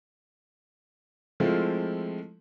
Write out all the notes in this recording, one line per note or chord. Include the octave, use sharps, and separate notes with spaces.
F3 G#3 A3 C4 E4 F4